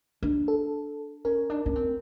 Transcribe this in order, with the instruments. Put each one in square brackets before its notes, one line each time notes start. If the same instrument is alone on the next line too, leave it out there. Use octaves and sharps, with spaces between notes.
[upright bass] D4
[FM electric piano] A4
[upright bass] C#4 [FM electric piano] A#4
[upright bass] D4
C#4
C4